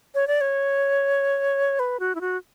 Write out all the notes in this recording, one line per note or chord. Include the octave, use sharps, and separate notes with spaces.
C#5
D5
C#5
B4
F#4
E4
F#4